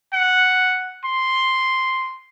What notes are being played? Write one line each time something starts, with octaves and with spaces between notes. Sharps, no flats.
F#5
C6